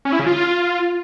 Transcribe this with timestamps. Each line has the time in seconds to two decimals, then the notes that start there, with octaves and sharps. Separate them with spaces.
0.05 C#4
0.12 E4
0.19 C#3
0.27 F4